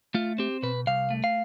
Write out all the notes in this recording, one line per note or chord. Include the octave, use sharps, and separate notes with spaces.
A3 F4
C4 G4
B2 B4
C2 F5
A3
F5